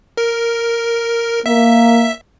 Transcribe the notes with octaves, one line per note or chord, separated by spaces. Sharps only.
A#4
A#3 E5